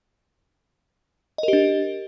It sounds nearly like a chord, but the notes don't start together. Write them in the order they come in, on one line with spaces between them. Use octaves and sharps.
D#5 A#4 G4 D4